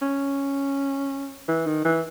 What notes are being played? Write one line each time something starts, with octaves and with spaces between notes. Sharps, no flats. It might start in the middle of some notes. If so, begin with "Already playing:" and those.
C#4
E3
D#3
E3